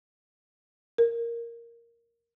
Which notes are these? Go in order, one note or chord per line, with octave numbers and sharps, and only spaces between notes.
A#4